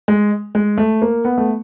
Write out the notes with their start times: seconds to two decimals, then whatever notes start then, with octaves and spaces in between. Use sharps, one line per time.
0.08 G#3
0.55 G#3
0.78 A3
1.02 A#3
1.25 B3
1.38 A3